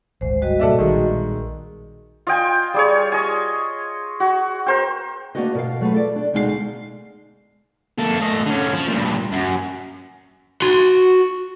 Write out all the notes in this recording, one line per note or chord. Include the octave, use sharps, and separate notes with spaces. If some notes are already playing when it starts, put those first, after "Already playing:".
D1 G#1 G#3 C5
G3 F#4 D#5
B2 A3 A#3 A4 D5 E5
A#1 D#3 G#3 B3
F4 D#5 G5 G#5
G3 G#4 C#5
D#5 G#5
F#4
A#4 C5 G5
A#3 C#4 D4 F#4 B4 D#5
B2 A#4 F5
F#3 A3 F4 B4
A4 D5
D4 A4
D2 B2 G#3 D#4 F#4 F5
A#3 A4
A3 D#5
D3 C#4
F3
G2 A#2
F#2
F#4 C6